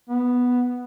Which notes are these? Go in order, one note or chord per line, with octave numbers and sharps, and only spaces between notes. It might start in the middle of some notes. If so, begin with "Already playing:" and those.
B3